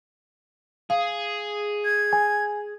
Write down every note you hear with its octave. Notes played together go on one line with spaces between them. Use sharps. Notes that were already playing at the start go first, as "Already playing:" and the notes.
G#4 F5
G#6
G#5